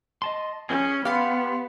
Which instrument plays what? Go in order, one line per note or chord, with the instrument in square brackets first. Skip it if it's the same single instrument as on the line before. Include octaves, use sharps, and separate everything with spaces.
[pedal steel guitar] D#5 A5 C6
[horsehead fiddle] C#4 [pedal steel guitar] G#4 G#5
[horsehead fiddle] B3 [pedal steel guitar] G4 F#5 [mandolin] F5 C6